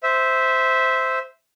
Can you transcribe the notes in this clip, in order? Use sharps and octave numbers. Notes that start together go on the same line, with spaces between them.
C5 E5